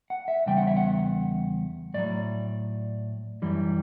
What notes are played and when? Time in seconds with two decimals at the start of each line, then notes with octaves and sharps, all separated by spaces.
0.10 F#5
0.28 E5
0.46 E2 C#3 G3 G5
0.57 F#5
0.67 E5
0.77 F#5
1.94 A2 F#3 D5
3.42 F#2 E3 G3